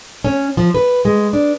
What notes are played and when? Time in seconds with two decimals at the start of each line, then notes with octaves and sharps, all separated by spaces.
0.24 C#4
0.57 F3
0.74 B4
1.05 G#3
1.33 D4